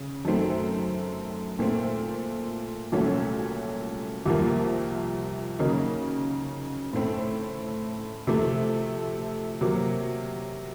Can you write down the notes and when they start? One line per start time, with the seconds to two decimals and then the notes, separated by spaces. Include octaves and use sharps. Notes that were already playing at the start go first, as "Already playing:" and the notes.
Already playing: C#3
0.25 F#2 D#3 A3 C4
1.59 A#2 A3 C4
2.92 C2 A#2 F#3 A3 C#4
4.26 C2 C3 F3 A#3
5.59 C#3 F#3 A#3 D#4
6.93 A2 A3 C4
8.27 C3 F3 A3
9.61 C3 F#3 A#3